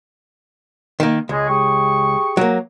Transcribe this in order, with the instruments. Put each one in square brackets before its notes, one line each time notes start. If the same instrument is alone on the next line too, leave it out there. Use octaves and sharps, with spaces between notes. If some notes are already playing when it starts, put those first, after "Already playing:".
[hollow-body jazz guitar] D#3 A#3
[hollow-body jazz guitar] C#2 [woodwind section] G#3
[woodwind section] G4 G#4 C#6
[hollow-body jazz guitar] F#3 A#3